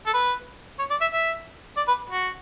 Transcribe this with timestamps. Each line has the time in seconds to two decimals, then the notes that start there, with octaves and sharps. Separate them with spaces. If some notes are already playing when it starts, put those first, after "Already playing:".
0.06 A4
0.14 B4
0.79 C#5
0.90 D5
1.01 E5
1.12 E5
1.77 D5
1.88 B4
2.10 F#4